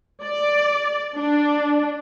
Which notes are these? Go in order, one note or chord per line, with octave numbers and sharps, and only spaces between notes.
D5
D4